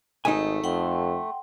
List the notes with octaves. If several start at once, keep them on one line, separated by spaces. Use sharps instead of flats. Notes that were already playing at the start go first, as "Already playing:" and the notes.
G#1 A3 D#4 D#5 G#5
F2 F#5 G5 C6